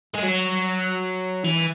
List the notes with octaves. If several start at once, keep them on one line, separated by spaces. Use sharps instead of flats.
G#3
F#3
E3